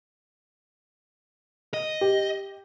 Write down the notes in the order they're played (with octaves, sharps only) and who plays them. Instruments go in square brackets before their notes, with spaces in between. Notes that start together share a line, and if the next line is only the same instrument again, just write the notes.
[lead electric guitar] D#5
[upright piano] G4